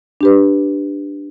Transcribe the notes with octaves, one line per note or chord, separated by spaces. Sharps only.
D4 G4 B4